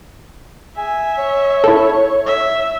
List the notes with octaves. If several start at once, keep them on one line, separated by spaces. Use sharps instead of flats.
E5 G#5
C#5
E4 A4
E5